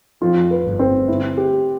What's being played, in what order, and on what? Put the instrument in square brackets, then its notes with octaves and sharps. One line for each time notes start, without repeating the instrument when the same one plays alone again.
[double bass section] F2 [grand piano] F4
[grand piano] B4
[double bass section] G1 G2
[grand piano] C4
[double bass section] G1 G2 [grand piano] E4
[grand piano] G4